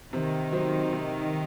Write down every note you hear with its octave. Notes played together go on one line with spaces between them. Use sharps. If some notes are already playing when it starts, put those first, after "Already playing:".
C3 D#3
F#3 C4
C3